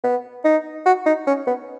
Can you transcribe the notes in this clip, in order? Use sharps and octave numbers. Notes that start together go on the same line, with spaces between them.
B3
D#4
F#4
D#4
C#4
B3